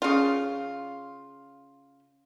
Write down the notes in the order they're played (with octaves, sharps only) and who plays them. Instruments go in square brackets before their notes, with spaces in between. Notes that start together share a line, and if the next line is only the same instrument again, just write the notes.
[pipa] C#3 F4